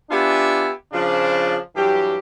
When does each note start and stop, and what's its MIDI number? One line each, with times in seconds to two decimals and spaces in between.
0.10 0.70 59
0.10 0.70 62
0.10 0.70 65
0.10 0.70 67
0.10 0.70 76
0.10 0.70 80
0.92 1.57 49
0.92 1.57 53
0.92 1.57 62
1.75 2.17 43
1.75 2.17 52
1.75 2.17 54
1.75 2.17 67